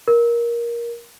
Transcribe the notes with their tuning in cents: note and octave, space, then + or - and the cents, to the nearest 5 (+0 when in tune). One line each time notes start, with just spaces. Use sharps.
A#4 +15